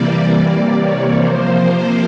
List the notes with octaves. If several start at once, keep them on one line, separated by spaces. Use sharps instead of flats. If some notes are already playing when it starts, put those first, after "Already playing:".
Already playing: C3 E3 G3 A#3 D5
D5
C#5
C3 F3 A#3 C5
C5